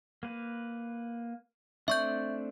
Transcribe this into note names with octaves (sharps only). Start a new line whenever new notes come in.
A#3 B4
A3 C4 D4 E5 C#6 G6